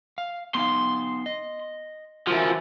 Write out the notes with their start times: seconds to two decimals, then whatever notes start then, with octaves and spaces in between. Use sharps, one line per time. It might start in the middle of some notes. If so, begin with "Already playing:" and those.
0.18 F5
0.55 B3 D#4 F5 C6
1.26 D#5
2.27 E3 F3 F#4 A#4